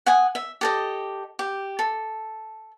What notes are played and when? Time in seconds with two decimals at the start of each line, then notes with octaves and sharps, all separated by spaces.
0.06 F#5 G#5 D#6
0.35 E5
0.61 G4 A4 D#5
1.39 G4
1.79 A4